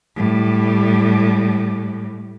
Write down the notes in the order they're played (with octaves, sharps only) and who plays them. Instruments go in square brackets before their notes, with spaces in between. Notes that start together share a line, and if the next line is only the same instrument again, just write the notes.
[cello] A2 G3